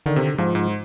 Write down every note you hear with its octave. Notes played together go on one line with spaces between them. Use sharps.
D3 D#3
C3
G#2 F3
G#2